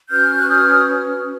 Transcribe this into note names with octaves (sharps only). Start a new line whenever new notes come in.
C#4 F#4 B4 F6 G6
F#6
D#6 F6